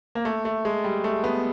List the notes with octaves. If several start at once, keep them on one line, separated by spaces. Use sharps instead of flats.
A#3
A3
A3
G#3
G3
A3
B3